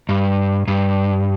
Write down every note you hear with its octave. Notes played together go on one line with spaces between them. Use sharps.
G2
G2